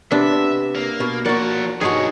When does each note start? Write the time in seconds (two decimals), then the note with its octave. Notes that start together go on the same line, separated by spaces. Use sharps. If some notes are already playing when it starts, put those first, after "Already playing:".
0.12 C3 B3 D4 E5
0.76 A#3
1.00 B2
1.26 F3 A#3 F#4 D5 F#5
1.81 B1 G2 D#4 F#4 G#4 C#5